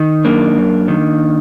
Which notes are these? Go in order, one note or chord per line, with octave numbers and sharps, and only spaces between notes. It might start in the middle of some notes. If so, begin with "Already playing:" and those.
Already playing: D#3
F#2 A#3 D4
F#2
D#3